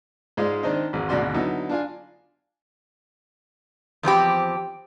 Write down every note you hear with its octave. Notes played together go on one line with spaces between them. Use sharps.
G#2 G#3 F4 D5
D#3 C4 D4 D#4
G#1 E2
G#1 D2 B2 D5 C6
D3 F#3 B3 D#4 E4
D4 F4 G#5
E2 F3 C4 G4